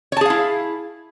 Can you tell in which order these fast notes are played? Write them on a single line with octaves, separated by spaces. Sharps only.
C#5 A5 G#4 F5 E4